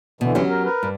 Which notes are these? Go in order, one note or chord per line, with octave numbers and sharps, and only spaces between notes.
B2 D3 E3
F#3 C#4 G4
A#4
A#4 B4
G2